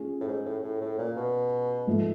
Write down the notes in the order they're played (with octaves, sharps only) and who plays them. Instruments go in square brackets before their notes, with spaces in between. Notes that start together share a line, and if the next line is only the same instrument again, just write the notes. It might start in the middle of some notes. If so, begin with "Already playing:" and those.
Already playing: [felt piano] A3 C#4 F4 G#4
[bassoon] A2
G#2
A2
A2
A2
A#2
B2
[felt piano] G#2 F3 A3